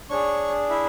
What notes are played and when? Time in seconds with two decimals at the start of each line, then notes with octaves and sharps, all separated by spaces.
0.10 D4 G#4 C#5 C#6
0.70 E4 E5